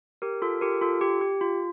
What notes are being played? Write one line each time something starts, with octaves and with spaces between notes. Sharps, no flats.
G4 A#4
F4 A4
G4 A#4
F4 A4
G4
G4
F4